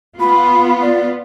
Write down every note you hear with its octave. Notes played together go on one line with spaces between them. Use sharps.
B3 F4 B5
D5